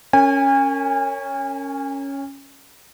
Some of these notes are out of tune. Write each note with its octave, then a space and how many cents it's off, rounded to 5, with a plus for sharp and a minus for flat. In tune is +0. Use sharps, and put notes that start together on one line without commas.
C#4 +0 A#4 -20 G#5 -35